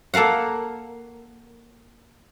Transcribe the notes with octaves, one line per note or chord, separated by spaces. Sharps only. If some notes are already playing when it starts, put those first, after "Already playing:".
A#3 A4 A#4 F5 F#5